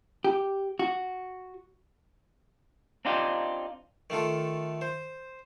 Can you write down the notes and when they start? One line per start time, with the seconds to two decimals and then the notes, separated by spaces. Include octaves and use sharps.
0.25 G4
0.79 F#4
3.05 C4 D4 D#4 F4 G4
4.10 D#3 A3 F4 A4
4.81 C5